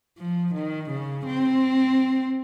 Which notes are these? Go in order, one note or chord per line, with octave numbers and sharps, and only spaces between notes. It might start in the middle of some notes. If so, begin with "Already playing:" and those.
F3
D#3
C#3
C4